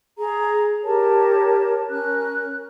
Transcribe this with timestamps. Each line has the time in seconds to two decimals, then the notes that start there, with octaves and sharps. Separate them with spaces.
0.19 G#4 A#5
0.84 G4 A#4 C#5 A5
1.89 C#4 A#4 F#6